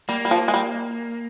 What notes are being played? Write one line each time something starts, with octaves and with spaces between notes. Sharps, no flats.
G3 A#3
G3
F3
G#3
G3